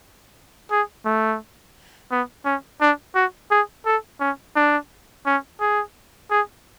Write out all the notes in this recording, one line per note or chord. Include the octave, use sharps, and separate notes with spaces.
G#4
A3
B3
C#4
D4
F#4
G#4
A4
C#4
D4
C#4
G#4
G#4